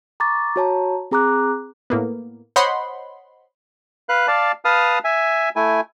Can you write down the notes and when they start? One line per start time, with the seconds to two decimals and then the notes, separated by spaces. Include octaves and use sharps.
0.20 A#5 C#6 D6 A6
0.56 F#4 C#5 A5 A#5
1.11 C4 G#4 A#5 D6 F#6
1.90 A2 A#3 B3
2.56 C5 C#5 D#5 F#5 B5 C6
4.09 B4 F5 F#6
4.28 D5 F5 A5
4.65 B4 F5 A5 D#6 F6
5.04 E5 G#5
5.56 A3 E4 G#5